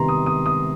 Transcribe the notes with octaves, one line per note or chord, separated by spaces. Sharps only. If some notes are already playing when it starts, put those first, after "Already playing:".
Already playing: C3 D#3 G3 B3 A#5 C6
D#6
D#6
D#6